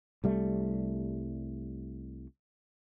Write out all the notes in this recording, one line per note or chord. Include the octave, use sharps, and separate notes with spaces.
C2 G3 A3